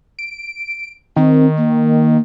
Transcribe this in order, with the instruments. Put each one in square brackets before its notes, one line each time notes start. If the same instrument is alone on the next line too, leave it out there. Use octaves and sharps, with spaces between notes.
[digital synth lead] D7
[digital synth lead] D#3 [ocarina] C4
[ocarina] A#3